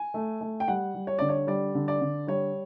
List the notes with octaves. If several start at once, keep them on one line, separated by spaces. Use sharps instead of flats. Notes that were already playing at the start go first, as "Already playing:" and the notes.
Already playing: G#5
A3
A3
G5
G3 F#5
G3
C#5
D3 D5
C#5
G3 D5
D3
D5
D3
G3 C#5